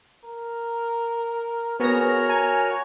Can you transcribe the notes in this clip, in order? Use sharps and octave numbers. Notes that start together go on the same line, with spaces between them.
A#4
B3 F#4 G#4 A#4 C#5 A#6
G#5 A#5